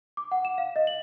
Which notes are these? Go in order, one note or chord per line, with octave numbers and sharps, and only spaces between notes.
D6
F#5
E7
F5
D#5
F#7